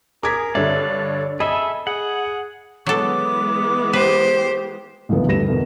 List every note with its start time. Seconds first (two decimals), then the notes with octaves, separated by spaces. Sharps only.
0.23 G#4 A#4 D6 G#6 B6
0.55 G2 D3 C#5 D5 E5
1.40 G#4 A4 D#5 E5 B5
1.87 G#4 F#5
2.86 E3 F#3 G#3 B3 A4 D6
3.93 G4 B4 C5
5.09 C#2 G2 E3 B3
5.27 D2 G2 G3 B4 A#6 E7
5.46 E2 B2 A#4